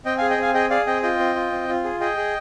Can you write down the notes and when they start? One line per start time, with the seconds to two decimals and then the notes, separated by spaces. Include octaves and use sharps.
0.05 C4 D#5 G5
0.18 F5 G#5
0.22 G#4
0.30 D#5 G5
0.38 C4 F5 G#5
0.54 G#4 D#5 G5
0.70 G#4 D5 F5
0.87 C4 D#5 G5
1.03 F4 D#5 G5
1.19 C4
1.35 F4
1.52 C4
1.68 F4
1.84 G#4
2.00 G#4 D#5 G5
2.17 G#4